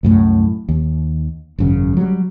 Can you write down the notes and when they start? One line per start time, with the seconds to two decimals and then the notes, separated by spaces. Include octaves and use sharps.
0.03 C2 F#2 A2 A3
0.69 D#2
1.58 G#1 F#2 C#3
1.97 F#3 G3